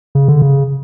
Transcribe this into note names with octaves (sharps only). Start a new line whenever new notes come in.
C#3
D3
C#3